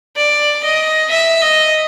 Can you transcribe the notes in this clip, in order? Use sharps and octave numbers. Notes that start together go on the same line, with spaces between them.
D5
D#5
E5
D#5